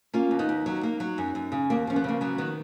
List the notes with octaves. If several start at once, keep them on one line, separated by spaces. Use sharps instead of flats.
A#3 C#4 F4
D#2
B3 D#4
D#2
F#3
A#3
F#3
F#2
F#2
C#3
D#2 A#3
F3 C#4
B3
C#3 A#3
F#3 B3
D#3 B3